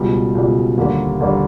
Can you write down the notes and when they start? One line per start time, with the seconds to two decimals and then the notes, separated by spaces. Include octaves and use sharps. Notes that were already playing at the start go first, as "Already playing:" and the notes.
Already playing: C#2 B2 G3
0.35 C#2 B2 G3
0.77 D#2 D3 G3 A#3
1.20 D#2 D3 G3 A#3